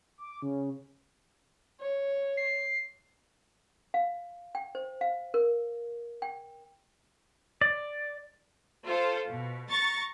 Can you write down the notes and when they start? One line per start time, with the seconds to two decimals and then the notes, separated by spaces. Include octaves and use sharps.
0.18 D6
0.42 C#3
1.81 C#5
2.37 C7
3.94 F5
4.55 G5
4.75 C5
5.01 F5
5.34 A#4
6.22 G5
7.61 D5
8.85 F4 A4 C5
9.31 B2
9.69 A#5 C#6 A6